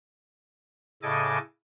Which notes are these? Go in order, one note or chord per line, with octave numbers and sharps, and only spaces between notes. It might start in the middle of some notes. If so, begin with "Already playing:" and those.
A2 C#3 A4 D#5 G#5 D6